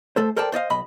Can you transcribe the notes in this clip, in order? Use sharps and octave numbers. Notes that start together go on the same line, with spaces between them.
A3 A4 C5
A4 A#4 C5 D5 G5 A5
C5 D5 D#5 F5
B1 D#5 B5